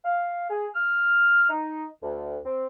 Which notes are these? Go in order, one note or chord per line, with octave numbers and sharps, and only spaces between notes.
F5
G#4
F6
D#4
D2
C4